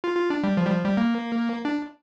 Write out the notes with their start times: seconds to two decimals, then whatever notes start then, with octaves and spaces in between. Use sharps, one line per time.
0.04 F4
0.17 F4
0.30 D4
0.44 G3
0.57 F3
0.66 G3
0.71 F3
0.84 G3
0.97 A#3
1.65 D4